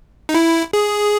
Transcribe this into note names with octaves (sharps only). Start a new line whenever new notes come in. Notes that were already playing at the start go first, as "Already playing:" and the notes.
D#4
E4
G#4